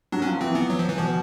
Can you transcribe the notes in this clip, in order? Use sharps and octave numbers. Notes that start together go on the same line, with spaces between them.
F#3 D4
C#4
F3
E3 C4
B3
F#3
F3
E3
B2 F3